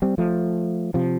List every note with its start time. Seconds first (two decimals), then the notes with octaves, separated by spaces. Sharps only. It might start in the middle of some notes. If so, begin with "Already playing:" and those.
0.02 G3 C4
0.18 F3 A3
0.94 C3 F3